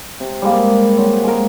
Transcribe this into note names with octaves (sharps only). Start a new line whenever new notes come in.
C3
G3 G#3 A#3
F#3 C4
G#3 A#4